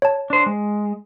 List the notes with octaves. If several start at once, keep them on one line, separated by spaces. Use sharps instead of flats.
C#5 A5
D4 C5
G#3